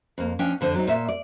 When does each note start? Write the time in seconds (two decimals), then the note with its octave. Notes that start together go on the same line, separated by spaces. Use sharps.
0.18 F2 A#3
0.39 F3 C#4 D4 G5
0.61 F2 D3 C5
0.75 F#3 C4 D#4
0.87 A#2 E5
1.09 D5